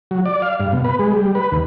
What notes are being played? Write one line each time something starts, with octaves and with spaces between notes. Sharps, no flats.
F#3
D5
F5
G2
B2
B4
G#3
G3
B4
D#2